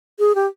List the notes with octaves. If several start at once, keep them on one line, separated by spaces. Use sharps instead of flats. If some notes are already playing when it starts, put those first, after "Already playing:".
G#4
G4